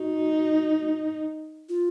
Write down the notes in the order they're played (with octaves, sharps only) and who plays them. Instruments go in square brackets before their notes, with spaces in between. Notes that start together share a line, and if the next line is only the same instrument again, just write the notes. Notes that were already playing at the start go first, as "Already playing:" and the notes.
Already playing: [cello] D#4 [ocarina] F#4
[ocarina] F4